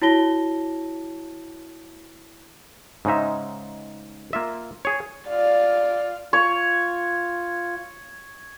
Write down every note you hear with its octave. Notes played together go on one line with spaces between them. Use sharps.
E4 F#4 C#5 A5 A#6 G7
G#2 C#3 G#3 D#4 E5
A#3 F4 E5
G#4 C#5
F4 D5 F5
F4 C#5